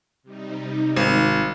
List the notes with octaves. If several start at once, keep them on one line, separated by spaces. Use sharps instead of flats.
C3 G3 D#4
G#1